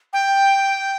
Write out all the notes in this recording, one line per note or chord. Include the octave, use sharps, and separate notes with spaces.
G5